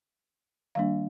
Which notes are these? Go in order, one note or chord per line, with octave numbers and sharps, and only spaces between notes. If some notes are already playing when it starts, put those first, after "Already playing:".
D#3 G3 A#3 D4 F5